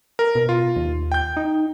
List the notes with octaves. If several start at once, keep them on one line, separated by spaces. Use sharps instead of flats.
A#4
B2
F4
D#2
G5 G6
D#4